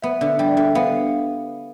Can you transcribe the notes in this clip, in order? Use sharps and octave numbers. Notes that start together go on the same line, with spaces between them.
B3 E5
D3 E5
G3 G5
D5
D3 E5
B3 F5